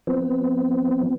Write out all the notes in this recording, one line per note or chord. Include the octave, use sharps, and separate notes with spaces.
F3 B3 C4